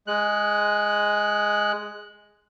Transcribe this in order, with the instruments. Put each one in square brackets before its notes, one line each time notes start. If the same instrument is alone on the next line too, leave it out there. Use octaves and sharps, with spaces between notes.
[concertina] G#3 F#6